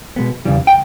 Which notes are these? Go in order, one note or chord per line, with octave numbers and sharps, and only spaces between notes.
B2 G#3 B3
E2 C#3 E3 G3
G5